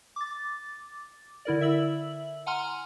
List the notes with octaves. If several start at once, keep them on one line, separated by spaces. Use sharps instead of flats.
D6 A6
D3 E4 A#4 D5
E5 E6 F#7
F#5 G#5 A#5 C6 F6